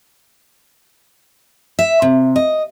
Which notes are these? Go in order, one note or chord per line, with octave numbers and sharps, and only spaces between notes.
E5
C3
D#5